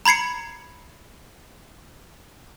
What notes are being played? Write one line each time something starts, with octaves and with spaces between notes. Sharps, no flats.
A#5 B5 G#6 C7 C#7